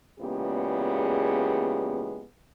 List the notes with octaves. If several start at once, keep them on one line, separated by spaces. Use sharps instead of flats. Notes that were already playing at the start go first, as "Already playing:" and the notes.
E2 A#2 C#3 G#3 B3 G4